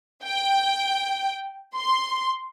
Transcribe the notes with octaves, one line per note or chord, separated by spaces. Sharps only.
G5
C6